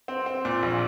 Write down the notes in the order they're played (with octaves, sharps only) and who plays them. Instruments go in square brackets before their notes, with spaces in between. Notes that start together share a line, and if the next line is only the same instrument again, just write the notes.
[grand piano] C4
C4
A#2
A#1